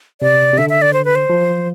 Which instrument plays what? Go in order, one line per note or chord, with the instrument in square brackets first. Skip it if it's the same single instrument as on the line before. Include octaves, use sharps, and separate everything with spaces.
[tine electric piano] C3 [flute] D5
[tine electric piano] C3
[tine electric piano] D3 [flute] E5
[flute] E5
D5
C5
B4
C5
[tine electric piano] F3